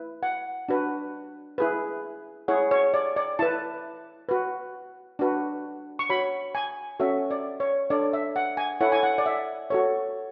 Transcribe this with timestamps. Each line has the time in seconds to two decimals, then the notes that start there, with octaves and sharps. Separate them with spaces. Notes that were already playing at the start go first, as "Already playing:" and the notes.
Already playing: E4 B4
0.23 F#5
0.69 D4 F#4 B4
1.58 E4 G#4 B4
2.48 E4 G#4 C#5 F#5
2.71 C#5
2.94 D5
3.16 D5
3.39 E4 B4 A5
4.29 F#4 B4
5.19 D4 F#4 B4
5.99 C#6
6.10 F#4 C#5 B5
6.55 G#5
7.00 C#4 F#4 A4 C#5 E5
7.31 D5
7.60 C#5
7.90 D4 A4 C#5 D5
8.13 E5
8.36 F#5
8.57 G#5
8.81 E4 A4 C#5 F#5
8.92 G#5
9.03 F#5
9.18 D5
9.26 E5
9.70 F#4 A4 C#5